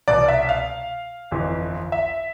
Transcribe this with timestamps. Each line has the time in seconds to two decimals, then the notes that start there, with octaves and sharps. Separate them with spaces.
0.08 C2 B2 D5
0.28 E5
0.49 F5
1.31 G1 F2 E3
1.92 E5